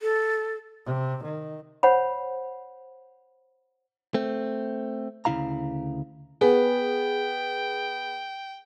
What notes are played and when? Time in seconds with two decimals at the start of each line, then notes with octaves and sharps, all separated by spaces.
0.02 A4
0.86 C3
1.23 D#3
1.83 C5 C#5 F#5 B5
4.14 A3 C4
5.25 D2 C#3 F#3 E4 F5 A#5
6.41 B3 G#4 G5